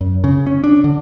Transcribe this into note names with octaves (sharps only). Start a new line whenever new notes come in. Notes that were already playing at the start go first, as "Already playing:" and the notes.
F#2
C#3
C#4
D4
D3